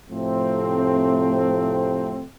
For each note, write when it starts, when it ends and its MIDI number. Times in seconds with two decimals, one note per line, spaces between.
0.10 2.25 45
0.10 2.25 48
0.10 2.25 53
0.10 2.25 57
0.10 2.25 60